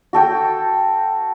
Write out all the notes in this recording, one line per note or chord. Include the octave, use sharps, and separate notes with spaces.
F#4 A4 G5